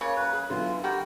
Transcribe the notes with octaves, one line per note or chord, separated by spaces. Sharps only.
C#3 A#3 C#5
F#2 B4 A#5
G#4
D3 E3 F#3 B3 F4
B2 F#4 G4 A#4 G5